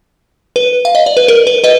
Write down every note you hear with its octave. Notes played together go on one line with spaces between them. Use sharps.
B4
F5
D#5
D5
B4
A#4
B4
B4 D#5